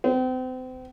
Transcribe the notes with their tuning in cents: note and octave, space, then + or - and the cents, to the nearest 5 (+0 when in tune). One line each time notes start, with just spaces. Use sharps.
C4 -35